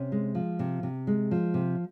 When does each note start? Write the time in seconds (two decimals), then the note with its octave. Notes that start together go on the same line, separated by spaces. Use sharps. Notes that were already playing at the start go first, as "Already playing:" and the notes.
Already playing: C3 C#4
0.12 G#3
0.35 F3
0.59 C3
0.83 C3
1.07 G#3
1.31 F3
1.54 C3